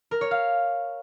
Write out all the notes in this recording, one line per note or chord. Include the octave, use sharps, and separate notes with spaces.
A#4
C#5
F5